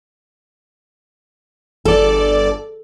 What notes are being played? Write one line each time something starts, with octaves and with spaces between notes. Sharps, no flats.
G1 A4 D5